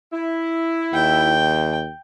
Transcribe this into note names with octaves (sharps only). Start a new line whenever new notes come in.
E4
D#2 G5